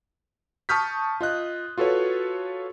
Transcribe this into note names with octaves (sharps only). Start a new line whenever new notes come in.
A5 C#6 D#6 F6 G6 B6
F4 D#5 F#6
F4 F#4 A4 B4 C#5